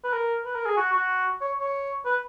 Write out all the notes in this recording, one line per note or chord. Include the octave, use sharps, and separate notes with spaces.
B4
A#4
B4
A#4
G#4
F#4
F#4
C#5
C#5
B4